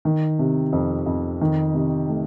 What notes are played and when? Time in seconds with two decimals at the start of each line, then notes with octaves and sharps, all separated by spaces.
0.05 D#3
0.39 C3
0.72 F2
1.06 F2
1.41 D#3
1.74 C3
2.09 A3